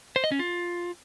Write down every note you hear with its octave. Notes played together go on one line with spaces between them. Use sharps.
C5
D#5
C#4
F4